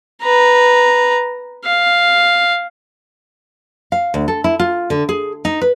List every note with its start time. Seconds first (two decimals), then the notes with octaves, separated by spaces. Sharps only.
0.23 B4 A#5
1.65 F5
3.92 F5
4.14 D2
4.28 A4
4.44 E4
4.59 F4
4.90 D3
5.09 G#4
5.45 D#4
5.61 B4